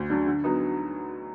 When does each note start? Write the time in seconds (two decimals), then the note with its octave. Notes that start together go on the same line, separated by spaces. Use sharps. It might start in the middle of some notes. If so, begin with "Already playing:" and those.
Already playing: D2
0.10 D3 F#3 D4
0.27 D3
0.44 F#3 B3 D#4